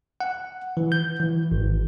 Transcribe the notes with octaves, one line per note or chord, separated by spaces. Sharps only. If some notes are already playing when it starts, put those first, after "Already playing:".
F#5
E3
G6
E3
G#1